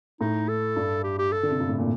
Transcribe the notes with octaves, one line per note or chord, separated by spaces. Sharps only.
A2 D#4
A4
G2
G4
G4
A4
D3
C3
G2
A2
A#2